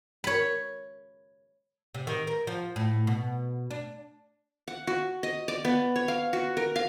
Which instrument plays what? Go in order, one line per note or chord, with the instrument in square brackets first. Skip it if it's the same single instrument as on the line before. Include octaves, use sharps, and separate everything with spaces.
[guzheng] C#5 B5
[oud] C3
D#3
A#4
F3
A2
B2
D4
[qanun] F#5
F#4
D#5
D5
B3
C#5
F5
F#4
A#4
F5